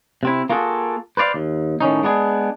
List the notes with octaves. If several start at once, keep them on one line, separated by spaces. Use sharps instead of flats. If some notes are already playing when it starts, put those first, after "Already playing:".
C3 C4 E4
A#3 F4 F#4 G#4 A4
B4 C5 D5 F5
D#2
A2 D#3 C#4 D#4
G#3 B3 D4 G#4